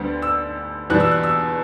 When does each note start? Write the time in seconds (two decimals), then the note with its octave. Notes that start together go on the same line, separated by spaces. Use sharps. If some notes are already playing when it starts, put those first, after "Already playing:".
Already playing: D2 D3 G3 B3
0.22 E6
0.90 E2 B2 G3 F#6
1.00 E6
1.11 F#6
1.23 E6